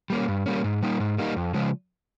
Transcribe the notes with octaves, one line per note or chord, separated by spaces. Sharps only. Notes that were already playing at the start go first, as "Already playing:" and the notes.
G3 A#3 C#4
G2
G3 A#3 C#4
G#2
G3 A#3 D#4
G#2
G3 A#3 D#4
F2
C#3 F3 G#3